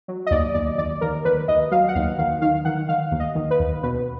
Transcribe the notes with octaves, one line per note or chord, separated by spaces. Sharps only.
F#3
D#5
D#2 D5
D#2 D5
D#2 D5
D#2 A#4
D#2 B4
D#2 D#5
F#3 F5
F#5
D#2 F5
D#3 F5
D#3 F5
D#3 F#5
D#3 F5
D#2
D#5
D#3
B4
D#2
B2 B4